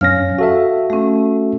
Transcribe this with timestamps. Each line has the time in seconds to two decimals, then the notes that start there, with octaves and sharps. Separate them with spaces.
0.01 F#2 C#4 F5 F6 A#6
0.39 F#4 A4 E5 F5
0.90 A3 C#4